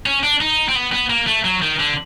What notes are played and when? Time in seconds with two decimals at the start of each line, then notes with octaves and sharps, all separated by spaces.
0.06 C#4
0.23 D4
0.41 D#4
0.69 C4
0.75 B3
0.92 B3
1.10 A#3
1.27 A3
1.45 F#3
1.62 D#3
1.79 D3